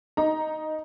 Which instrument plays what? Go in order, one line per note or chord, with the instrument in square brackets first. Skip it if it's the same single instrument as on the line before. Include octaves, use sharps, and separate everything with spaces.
[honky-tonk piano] D#4 A#5